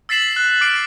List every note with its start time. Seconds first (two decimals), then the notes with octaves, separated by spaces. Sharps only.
0.09 E6 A6 B6 C7 E7 F#7
0.36 F#6
0.61 D6 F6 C7 D7